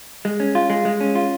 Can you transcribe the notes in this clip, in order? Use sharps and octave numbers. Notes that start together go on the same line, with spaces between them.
G#3
C#4
F4
G#3
G#3
C#4
F4